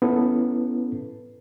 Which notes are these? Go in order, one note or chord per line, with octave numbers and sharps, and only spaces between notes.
B3 C#4 E4 A4 B4